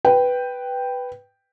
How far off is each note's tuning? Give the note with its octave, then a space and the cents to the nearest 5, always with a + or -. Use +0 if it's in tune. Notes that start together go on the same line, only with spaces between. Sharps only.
B4 +0 G5 +0